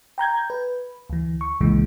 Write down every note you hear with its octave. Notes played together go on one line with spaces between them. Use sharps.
G5 A#5 G6 G#6
B4
D2 E3
C#6
C2 F2 A#2 C#3 E3 G#3